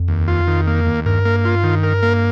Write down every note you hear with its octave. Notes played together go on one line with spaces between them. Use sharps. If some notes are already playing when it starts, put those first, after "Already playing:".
Already playing: F2
D#2
F4
D#3
A#3
D#2
G2 A#4
A#3
F4
D#3
A#4
A#3